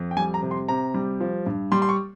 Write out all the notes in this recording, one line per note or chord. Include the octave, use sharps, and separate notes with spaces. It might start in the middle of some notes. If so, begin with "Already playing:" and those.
Already playing: F2
G5
G3 G#5
A#5
C3
C6
C3 A#5
G3
F3
G2
G3 C6
C6
C#6